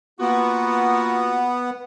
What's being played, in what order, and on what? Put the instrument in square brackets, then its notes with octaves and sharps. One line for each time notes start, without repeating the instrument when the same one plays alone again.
[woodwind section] A#3 F4 F#4 [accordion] B3